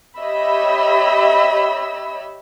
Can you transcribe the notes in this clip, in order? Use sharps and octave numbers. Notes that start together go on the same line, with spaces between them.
G4 C#5 D#5 E5 B5 E6